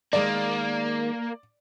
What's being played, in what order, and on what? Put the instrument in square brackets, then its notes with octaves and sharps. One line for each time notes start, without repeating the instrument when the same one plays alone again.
[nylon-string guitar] D#3 G#3 [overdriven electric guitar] A#3 [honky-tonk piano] D5